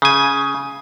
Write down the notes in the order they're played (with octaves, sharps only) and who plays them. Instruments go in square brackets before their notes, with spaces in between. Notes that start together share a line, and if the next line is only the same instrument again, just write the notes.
[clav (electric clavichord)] C#3 G#5